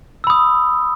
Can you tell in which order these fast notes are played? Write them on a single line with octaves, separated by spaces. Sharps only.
E6 B5 D#6